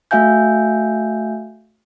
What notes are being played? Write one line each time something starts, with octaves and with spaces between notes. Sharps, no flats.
A3 F#4 E5 F5 G#5 G6